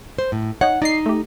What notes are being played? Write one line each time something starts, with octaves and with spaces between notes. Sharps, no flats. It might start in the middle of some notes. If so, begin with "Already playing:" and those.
C5
A2
D#4 C#5 F#5
D#4 D5 D#5 C7
A3 G4